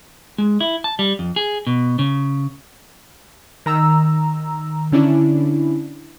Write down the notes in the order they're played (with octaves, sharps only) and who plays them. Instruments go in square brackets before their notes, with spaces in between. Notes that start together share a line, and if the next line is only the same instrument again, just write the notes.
[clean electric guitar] G#3
E4
A5
G3
F2
G#4
B2
C#3
[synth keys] D#3 A#5 E6
D3 C#4 D4 E4